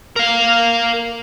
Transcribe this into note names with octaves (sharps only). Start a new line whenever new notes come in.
A#4 F5